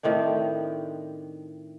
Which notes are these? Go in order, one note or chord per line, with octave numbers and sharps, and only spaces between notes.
A2 D#3 C4 D4